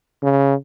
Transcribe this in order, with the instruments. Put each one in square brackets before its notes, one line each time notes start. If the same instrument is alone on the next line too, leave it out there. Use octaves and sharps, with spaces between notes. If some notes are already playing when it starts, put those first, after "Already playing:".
[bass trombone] C#3